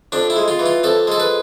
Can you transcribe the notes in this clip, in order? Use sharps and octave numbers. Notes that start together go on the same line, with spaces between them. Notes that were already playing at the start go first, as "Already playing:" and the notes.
F2 D4
E4
G#3
F4
E3
F4
F2 A4
G#3 A4
B4